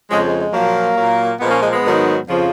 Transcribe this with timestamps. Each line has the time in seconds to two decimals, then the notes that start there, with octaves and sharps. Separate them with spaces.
0.10 F2 C#3 F3 G#3
0.24 G#3
0.39 G#3
0.53 A#2 F3 F#3 A#3
0.96 A#2 F#3
1.39 A#2 F3 G#3 B3
1.50 A#3 C#4
1.62 G#3
1.72 G#3 B3
1.83 G#2 D#3 F#3
2.26 F2 C#3 F3